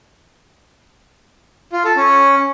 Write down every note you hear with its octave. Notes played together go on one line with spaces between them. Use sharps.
F4
A4
C#4